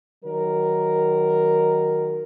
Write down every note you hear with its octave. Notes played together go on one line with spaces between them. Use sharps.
D#3 F#3 A#4